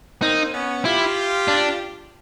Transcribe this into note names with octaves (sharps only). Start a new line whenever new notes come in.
A#3 C4 D#4
B3 C#4
E4 F4 G4
D4